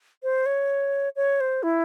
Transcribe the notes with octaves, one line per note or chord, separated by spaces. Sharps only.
C5
C#5
C#5
C5
E4